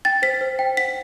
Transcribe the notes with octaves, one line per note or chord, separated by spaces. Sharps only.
G5 A6
C5 B6
C5
G5
F#5 B6